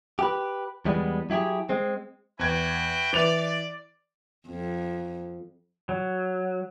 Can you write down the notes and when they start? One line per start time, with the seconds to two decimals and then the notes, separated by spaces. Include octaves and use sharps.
0.19 G4 B4
0.85 E2 G3 G#3 B3
1.30 F#3 E4 G4 G#4
1.69 G#3 C4
2.39 E2 E4 F#4 G5 G#6
3.13 E3 D5 F7
4.48 F2
5.89 F#3